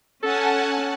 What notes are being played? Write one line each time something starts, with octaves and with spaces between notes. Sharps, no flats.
C#4 A4 F#5 G#5 A5